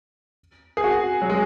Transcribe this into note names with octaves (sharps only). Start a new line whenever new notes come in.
G#4
F#4
F#3
G#3